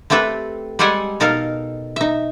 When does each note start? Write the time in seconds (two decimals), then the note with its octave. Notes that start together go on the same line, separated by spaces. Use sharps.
0.10 A3 C4 G4 A4 B4
0.79 G3 G#3 G4 A4 F#5 G#5
1.20 B2 D#4 A4 A#4 F5
1.96 D#4 E5